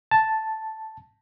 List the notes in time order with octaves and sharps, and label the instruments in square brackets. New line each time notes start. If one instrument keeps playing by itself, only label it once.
[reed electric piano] A5